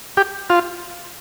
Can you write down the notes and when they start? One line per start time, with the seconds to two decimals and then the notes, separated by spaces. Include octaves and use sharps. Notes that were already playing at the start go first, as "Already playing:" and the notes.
0.17 G4
0.50 F4